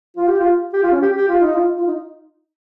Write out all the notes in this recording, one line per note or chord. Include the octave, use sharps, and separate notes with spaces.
F4
G4
F4
G4
F4
C#4
G4
G4
F4
D#4
F4
F4
D#4